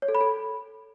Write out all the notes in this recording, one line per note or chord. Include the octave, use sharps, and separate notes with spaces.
C#5
A4
B5
A4